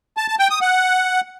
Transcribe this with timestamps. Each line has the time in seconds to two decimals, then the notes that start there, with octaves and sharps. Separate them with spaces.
0.17 A5
0.28 A5
0.39 G5
0.50 D#6
0.61 F#5